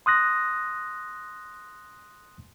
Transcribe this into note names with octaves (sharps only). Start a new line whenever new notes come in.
C6 D#6 F#6 A#6